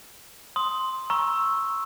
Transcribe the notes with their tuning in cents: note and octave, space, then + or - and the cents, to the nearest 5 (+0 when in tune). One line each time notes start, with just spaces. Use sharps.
C6 +0 D#6 +15
A#5 +25 C#6 -15 E6 +0